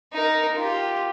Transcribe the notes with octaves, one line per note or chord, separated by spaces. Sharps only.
D#4 A#4
F4 G4